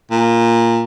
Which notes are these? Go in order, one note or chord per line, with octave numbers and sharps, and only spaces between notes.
A#2